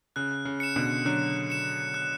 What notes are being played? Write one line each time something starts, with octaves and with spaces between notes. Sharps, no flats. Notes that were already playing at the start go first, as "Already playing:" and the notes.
C#3 F#6
C#3
C#7 E7
B2 D3
D3 F#3 F#6
C#7 E7
F#6